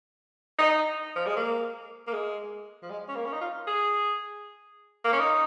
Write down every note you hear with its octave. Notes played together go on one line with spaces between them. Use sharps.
D#4
F3
G#3
A#3
A#3
G#3
F3
G#3
C#4
A#3
C#4
D#4
F4
G#4
A#3
C#4
D#4